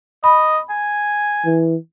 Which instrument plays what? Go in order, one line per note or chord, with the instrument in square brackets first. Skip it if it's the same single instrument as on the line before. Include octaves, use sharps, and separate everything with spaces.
[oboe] D#5 [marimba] B5
[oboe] G#5
[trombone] E3